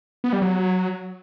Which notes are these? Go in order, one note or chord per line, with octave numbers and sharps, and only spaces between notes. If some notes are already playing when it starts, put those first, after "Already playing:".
B3
G3
F#3